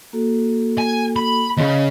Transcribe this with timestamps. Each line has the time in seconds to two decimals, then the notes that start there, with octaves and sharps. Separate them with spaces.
0.13 A#3 F#4 A4
0.78 G#5
1.16 B5
1.57 D#2 C#3 D#5